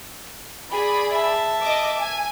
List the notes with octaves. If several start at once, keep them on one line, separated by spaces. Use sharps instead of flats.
G#4 D5 B5
E5 A5
D#5 D6
G#5